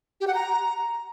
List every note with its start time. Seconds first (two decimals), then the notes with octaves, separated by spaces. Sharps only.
0.21 G4
0.28 F#5
0.34 A#5